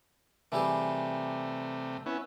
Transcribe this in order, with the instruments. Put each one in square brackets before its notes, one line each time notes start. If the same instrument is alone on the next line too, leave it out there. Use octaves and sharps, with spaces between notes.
[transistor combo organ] C3 A3 [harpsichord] E3 G3 G#4
[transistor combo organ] B3 C#4 E4